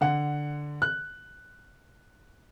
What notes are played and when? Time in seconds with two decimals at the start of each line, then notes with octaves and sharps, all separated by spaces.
0.01 D3 F#5
0.82 F#6